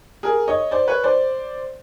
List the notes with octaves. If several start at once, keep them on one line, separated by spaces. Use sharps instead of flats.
G#4 A#4
C#5 D#5
C5 D5
B4 C#5
C5 D5